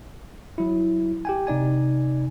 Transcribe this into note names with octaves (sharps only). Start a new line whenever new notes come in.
F#3 E4
G4 G5 G#5
C3 D#4 D5 G#5